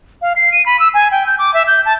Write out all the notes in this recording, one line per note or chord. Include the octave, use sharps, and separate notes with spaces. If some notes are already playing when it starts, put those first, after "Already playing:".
F5
C7
D#7
B5
E6
G#5
G5
G6
D6
E5
G6
A5